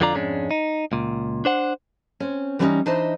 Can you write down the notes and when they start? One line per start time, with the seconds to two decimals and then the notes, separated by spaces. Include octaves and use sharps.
0.01 F2 D3 F4 D5 A#5
0.15 F2 G#2 G#3 C#4 D4
0.51 D#4
0.92 C#2 A#2
1.45 D4 C5 F#5
2.20 C4 C#4
2.59 E3 G3 A#3 C4 C#4 D#4
2.86 E3 D4 D#4 C5 D#5 E5